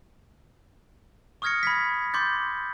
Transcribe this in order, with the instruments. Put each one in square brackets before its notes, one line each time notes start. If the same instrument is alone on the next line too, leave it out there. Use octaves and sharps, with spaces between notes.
[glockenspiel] C#6 D#6 F6 G#6 A#6 C#7
B5 G#6 B6
C6 D6 G6 A6